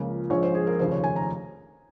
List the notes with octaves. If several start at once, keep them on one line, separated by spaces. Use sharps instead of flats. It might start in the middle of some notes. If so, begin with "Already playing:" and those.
Already playing: C#2 C#3 F3 A#3
A#1 G#2 F3 G#3 C#5
C5
G#4
A#4
F1 D#2 C#3 F3 C5
C#5
G#5
A#5